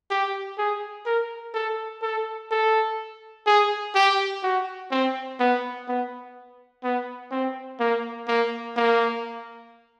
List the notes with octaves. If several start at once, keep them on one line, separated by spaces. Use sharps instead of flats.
G4
G#4
A#4
A4
A4
A4
G#4
G4
F#4
C4
B3
B3
B3
C4
A#3
A#3
A#3